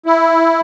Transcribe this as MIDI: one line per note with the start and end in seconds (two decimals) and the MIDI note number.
0.06 0.61 64